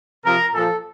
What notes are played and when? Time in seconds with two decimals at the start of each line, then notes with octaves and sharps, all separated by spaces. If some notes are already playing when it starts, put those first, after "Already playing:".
0.24 C3 F3 A#4
0.54 A#2 F3 A4